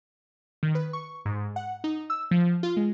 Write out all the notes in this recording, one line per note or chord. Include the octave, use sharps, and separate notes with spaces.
D#3
B4
C#6
G#2
F#5
D#4
E6
F3
F4
G#3